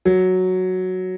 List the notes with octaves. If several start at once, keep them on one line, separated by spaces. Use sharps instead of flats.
F#3